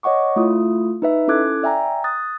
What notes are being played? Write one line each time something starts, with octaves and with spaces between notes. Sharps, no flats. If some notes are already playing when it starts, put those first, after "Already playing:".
C#5 D#5 F#5 C#6 D6
A3 E4 F4 D#6
D#4 B4 E5
C#4 E4 A4 D6 F#6 G#6
D5 E5 G5 G#5 A#5
D#6 F#6 A6